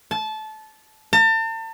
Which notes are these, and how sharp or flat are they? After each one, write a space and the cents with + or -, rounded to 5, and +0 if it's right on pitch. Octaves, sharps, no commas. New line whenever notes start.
A5 -20
A5 +40